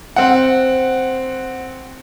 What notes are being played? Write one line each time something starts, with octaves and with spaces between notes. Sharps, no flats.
C4 F#5